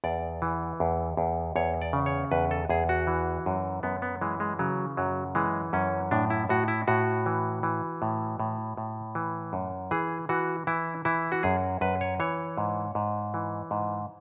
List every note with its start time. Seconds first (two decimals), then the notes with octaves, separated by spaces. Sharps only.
0.04 E2 D5
0.42 E3
0.80 E2
1.17 E2
1.56 E2 C#5
1.82 D5
1.93 C#3
2.06 C#5
2.32 E2 B4
2.51 A4
2.69 E2 G#4
2.89 F#4
3.07 E3
3.46 F#2
3.83 F#2 B3
4.02 B3
4.21 E3 G#3
4.40 G#3
4.59 C#3 F#3
4.97 F#2 F#3
5.35 E3 G#3
5.73 F#2 C#4
6.11 A2 D4
6.30 E4
6.49 A2 F#4
6.68 E4
6.88 A2 F#4
7.26 E3
7.63 E3
8.02 A2
8.40 A2
8.77 A2
9.15 E3
9.53 F#2
9.91 E3 G#4
10.29 E3 F#4
10.67 E3 E4
11.05 E3 E4
11.32 F#4
11.43 F#2 G#4
11.81 F#2 B4
12.01 C#5
12.20 E3 C#5
12.58 G#2
12.95 G#2
13.34 E3
13.71 G#2